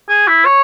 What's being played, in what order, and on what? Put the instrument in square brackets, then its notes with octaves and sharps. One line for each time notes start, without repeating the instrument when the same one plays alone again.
[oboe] G#4
E4
C#5